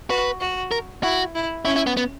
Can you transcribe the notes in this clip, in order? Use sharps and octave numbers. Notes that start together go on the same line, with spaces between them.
F#4 B4
F#4
A#4
E4 F#4
E4
C#4 E4
E4
B3
B3